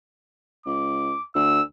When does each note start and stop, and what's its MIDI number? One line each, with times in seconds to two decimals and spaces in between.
0.66 1.13 37
0.66 1.25 86
1.35 1.61 38
1.35 1.63 88